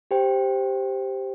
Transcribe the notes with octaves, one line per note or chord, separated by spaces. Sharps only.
G4 C5 G5